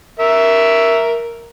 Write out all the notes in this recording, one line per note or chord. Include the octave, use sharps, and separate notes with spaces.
A#4 E5